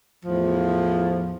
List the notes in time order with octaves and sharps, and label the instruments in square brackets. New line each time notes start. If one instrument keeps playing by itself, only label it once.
[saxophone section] E2 A2 F3